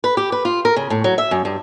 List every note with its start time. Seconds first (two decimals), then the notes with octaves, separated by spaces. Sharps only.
0.04 B4
0.17 G4
0.32 B4
0.45 F4
0.65 A#4
0.76 C#3
0.90 A2
1.04 F#3
1.18 E5
1.31 F#2
1.45 G2